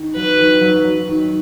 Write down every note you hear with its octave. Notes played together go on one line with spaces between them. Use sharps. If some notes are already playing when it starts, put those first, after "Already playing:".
Already playing: D#3
F#3 B4
D#3
F#3
F#3
D#3